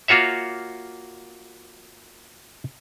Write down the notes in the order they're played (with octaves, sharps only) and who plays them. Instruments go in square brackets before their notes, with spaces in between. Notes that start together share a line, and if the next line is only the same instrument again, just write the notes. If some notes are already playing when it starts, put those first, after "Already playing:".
[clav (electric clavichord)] A#3 F4 F#4 C#5 E5